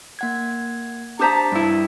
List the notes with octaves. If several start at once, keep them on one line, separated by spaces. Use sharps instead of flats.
A#3 F#5 G#6
D4 G4 C5 A5 A#5 D#6 B6
G2 E4